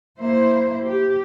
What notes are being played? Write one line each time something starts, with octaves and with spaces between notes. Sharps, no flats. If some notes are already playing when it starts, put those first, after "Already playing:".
A#3 E4 C5
G4